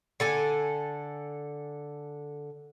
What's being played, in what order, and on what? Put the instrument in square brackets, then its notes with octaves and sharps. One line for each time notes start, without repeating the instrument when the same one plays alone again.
[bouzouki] D3 A4 G#5